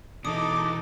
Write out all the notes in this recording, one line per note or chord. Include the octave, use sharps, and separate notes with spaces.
B2 E3 D#4 A4 D6 D#6